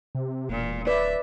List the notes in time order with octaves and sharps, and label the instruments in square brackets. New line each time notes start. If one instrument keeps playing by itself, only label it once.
[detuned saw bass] C3
[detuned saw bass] E1 [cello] A#2
[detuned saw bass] D1 [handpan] B4 D5 [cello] E5